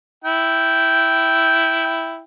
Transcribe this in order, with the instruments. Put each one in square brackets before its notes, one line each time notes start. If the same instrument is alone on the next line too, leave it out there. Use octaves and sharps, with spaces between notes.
[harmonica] E4 G5